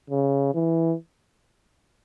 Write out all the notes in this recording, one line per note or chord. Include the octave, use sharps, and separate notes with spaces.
C#3
E3